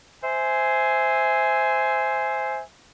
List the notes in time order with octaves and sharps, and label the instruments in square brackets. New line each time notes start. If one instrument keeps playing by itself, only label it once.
[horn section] C5 E5 G#5